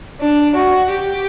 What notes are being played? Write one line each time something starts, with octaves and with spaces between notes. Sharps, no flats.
D4
F#4
G4